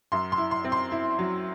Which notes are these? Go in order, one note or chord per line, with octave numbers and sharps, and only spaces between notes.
F#2 C6
C6
E4
C6
C4
C6
E4
F#3